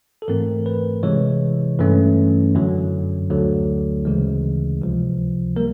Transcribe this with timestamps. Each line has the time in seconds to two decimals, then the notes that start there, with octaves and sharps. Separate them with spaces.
0.22 A4
0.28 G#2 E3 A3 C4 A#4
0.66 B4
1.03 C3 E3 G#3 C#5
1.79 G2 E3 A3 C#4
2.55 F#2 D3 F#3
3.30 D2 D3 F#3 A3
4.05 D2 C#3 E3 G#3
4.81 C#2 C3 F3
5.56 G3 A#3 A#4